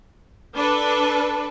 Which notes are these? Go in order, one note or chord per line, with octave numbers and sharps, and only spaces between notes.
D4 A4 B4